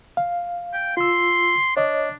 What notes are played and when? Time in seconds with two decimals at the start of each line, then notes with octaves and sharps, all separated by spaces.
0.17 F5
0.74 G5
0.97 F4 C6 E6
1.77 D4 C#5 D#5